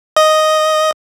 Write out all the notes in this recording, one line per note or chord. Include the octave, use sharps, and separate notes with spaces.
D#5